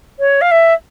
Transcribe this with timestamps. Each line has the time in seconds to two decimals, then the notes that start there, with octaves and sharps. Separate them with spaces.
0.19 C#5
0.41 F5
0.51 E5